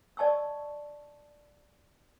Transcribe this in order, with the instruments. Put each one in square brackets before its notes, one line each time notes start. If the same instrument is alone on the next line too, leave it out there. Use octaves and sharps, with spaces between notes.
[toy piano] D5 D#5 A5 C#6 E6